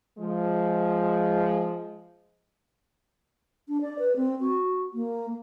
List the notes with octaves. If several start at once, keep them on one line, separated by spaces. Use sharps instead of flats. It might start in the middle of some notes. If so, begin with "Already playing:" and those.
F3 G#3
D4
D5
B4
C4
F#4
A#3